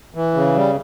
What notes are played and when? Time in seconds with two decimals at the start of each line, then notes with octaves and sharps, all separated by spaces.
0.15 E3
0.34 C#3
0.55 G3